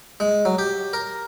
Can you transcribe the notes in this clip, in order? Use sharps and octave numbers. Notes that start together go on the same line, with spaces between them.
G#3
F#3
G4
A#4